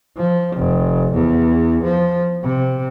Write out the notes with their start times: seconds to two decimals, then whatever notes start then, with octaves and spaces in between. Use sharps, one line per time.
0.16 F3
0.57 F1
1.13 E2
1.84 F3
2.43 C3